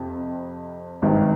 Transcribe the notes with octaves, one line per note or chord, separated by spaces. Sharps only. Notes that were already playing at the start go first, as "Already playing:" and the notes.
Already playing: F2 C3
G#1 G2 D#3